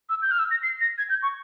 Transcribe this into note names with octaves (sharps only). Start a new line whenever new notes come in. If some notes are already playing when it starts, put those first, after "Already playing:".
E6
G6
F6
E6
A#6
C7
A#6
G#6
G6
C#6